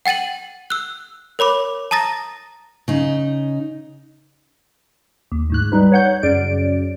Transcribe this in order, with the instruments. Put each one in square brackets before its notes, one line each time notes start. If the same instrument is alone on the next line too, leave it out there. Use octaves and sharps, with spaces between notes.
[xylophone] F#5 G5 A6 D#7 F#7
E6 F#6
A#4 C#5 B5 D6
A5 A#5 D#6 A6 A#6
[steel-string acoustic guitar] C#3 D#4
[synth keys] D#2
D2 G#2 F#6
G3 D#4 B4
C#5 F#5 G6
F#2 C#3 D5 D7